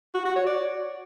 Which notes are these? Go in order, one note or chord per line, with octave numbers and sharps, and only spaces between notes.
F#4
F#4
C#5
D5